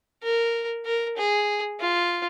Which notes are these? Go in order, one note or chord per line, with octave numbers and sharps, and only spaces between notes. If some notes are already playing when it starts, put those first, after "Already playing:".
A#4
A#4
G#4
F4